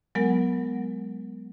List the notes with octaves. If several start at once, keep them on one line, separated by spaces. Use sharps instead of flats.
F#3 G#3 B3 A#4 F#5